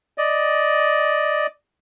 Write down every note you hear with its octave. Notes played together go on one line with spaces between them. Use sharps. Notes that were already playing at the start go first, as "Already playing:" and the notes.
D5 D#5